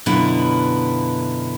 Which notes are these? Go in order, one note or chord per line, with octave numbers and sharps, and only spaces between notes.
F#2 B2 D3 B3 E4 F4